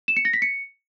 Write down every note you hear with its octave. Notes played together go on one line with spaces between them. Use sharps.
E7
C#7
A#6
B6
C#7